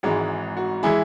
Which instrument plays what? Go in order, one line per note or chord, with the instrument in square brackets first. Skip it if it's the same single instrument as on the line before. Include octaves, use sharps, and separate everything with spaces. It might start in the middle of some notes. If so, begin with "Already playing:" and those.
[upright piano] G#1 G#2 E3 G#3 F#4
F#4
E3 G#3 E4 G#4